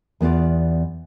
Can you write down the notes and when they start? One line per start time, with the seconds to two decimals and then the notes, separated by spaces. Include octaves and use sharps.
0.21 E2 B3 F4 D5